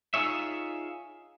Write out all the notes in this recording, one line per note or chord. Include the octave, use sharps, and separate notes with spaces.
D#4 F4 G#4 C#5 E5